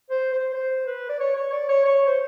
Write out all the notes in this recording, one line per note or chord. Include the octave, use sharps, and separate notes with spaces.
C5
C5
C5
B4
D5
C#5
C#5
D5
C#5
C#5
C5